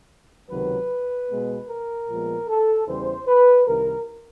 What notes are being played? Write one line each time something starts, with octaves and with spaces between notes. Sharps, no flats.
C#2 C3 D#3 F#3 B4
B2 G#3 B3
A#4
A#2 F3 G#3 B3
A4
E2 C#3 E3 G3 C5
B4
C2 C3 D#3 A#4